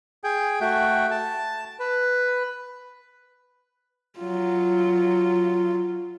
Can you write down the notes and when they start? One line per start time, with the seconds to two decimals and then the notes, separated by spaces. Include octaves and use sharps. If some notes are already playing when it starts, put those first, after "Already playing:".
0.24 G#4 G5
0.61 A3 F#4 G5
1.11 A5
1.79 B4
4.19 F#3 F4